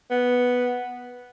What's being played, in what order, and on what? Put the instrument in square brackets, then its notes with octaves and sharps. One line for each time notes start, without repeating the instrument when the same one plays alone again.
[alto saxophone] B3